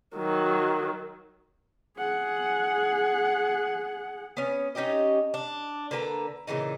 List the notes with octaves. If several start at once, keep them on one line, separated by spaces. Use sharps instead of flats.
D#3 F#3
G#4 F#5
B3 C#4
C#4 D#4 G4 D#5
D4
D3 A#3 B4 A#5
A#2 C#3 E3 D#4